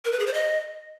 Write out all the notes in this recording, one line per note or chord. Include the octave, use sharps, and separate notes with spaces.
A#4
B4
G#4
C5
D#5